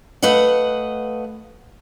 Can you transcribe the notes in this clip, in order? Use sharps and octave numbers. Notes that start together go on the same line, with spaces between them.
A3 B4 D#5 F5 F#5